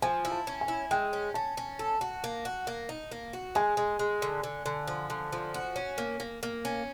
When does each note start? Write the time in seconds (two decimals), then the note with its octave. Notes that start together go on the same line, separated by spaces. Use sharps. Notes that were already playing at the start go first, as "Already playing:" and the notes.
0.02 F3 G#5
0.25 E4
0.32 A5
0.47 C#4
0.61 G#5
0.68 E4
0.91 G#3 G5
1.13 C#4
1.34 C#4 A5
1.57 C#4
1.79 A4
2.01 F#4
2.24 A#3
2.45 F#4
2.67 A#3
2.89 D#4
3.11 A#3
3.33 F#4
3.55 G#3 G#5
3.77 G#3
3.99 G#3
4.22 D3
4.43 D3
4.66 D3
4.87 F3
5.10 D3
5.32 F3
5.54 F#4
5.76 C#4
5.98 A#3
6.20 A#3
6.43 A#3
6.65 C#4